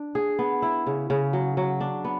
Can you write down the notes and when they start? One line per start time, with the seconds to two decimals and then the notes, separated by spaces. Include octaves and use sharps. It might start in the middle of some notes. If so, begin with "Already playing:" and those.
Already playing: D4
0.15 G#4
0.39 B3
0.62 E4
0.87 C#3
1.10 C#3
1.33 F#3
1.57 F#3
1.80 D4
2.04 B3